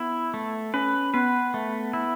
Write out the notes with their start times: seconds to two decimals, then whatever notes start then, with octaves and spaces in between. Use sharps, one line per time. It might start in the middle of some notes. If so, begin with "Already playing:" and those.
Already playing: B3 E4
0.34 A3
0.74 C#4 B4
1.14 B3 B4
1.54 A3
1.93 E4